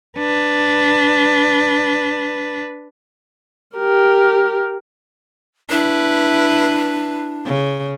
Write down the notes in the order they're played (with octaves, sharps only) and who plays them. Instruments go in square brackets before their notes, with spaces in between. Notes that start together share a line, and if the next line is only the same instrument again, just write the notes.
[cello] D4 B4
[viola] G4 A#4
[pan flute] D4 [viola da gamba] E4 B4
[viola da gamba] C#3